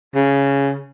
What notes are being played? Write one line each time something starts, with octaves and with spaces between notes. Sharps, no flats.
C#3